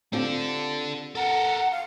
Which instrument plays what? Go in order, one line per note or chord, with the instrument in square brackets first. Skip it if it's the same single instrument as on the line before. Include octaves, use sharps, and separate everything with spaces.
[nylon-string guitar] C4 F4 G4 [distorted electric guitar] D4 A4
[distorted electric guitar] A4 A#4 [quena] F#5
[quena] F5